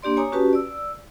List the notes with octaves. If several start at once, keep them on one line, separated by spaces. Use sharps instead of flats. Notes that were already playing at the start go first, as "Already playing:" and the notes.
A#3 D4 G4 D5 C6
C#5 G#5 A#5 D6 D#6
C#4 F#4 G4 B4 A5
D5 E6